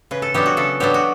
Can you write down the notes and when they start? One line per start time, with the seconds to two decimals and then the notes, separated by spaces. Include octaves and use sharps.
0.11 C#3 B4
0.22 A4
0.34 F#3 B3 D4 G4
0.46 F#4
0.57 C#3 A4
0.80 F#3 B3 D4 G4
0.94 F#4